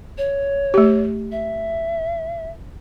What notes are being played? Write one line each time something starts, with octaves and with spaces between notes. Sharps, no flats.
C#5
A3 G4
E5